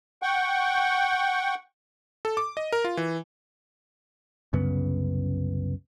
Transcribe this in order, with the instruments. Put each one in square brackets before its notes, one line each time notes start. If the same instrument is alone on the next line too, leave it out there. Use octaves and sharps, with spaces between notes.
[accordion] F#5 G5 C#6
[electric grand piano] A4
D6
D#5
A#4
F4
E3
[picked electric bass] C2 F#2 C#3 B3